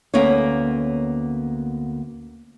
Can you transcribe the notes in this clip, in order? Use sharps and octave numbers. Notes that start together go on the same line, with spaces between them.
D2 A#3 B3 C#4 B4 C#5